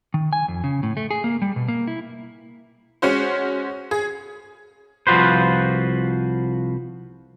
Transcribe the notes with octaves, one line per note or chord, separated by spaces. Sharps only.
D#3
G#5
F2
C#3
A2
A3
G#4
A#3
G3
B2
A#3
E4
G#3 C#4 F#4 C5
G#4
C2 F3 F4 F#4 B4 C5